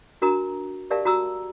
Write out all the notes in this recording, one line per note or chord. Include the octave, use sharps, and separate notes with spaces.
D4 F#4 A#4 A#5 D#6
G4 A#4 D5 E5 F5 A5
F#4 A#5 D#6 E6